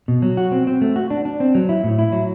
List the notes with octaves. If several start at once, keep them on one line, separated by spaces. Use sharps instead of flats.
B2
F#3
F#4
C4
C4
A3
F#4
D4
D4
C4
F#3
E4
A2
E4
F#3